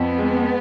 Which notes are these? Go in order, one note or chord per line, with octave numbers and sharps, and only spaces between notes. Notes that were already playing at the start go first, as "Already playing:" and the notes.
Already playing: F2 B3
G#3